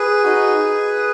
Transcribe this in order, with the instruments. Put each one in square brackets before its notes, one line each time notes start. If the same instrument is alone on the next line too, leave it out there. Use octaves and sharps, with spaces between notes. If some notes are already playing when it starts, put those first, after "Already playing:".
Already playing: [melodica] G#4 B4
D#4 F#4